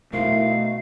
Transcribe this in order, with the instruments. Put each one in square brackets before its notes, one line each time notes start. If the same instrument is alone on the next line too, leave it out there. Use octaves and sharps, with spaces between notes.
[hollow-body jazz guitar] B2 A#4 C5 [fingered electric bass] A3 [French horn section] D#4 E4 [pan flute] F5